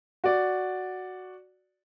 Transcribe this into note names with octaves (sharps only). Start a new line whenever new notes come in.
F#4 D5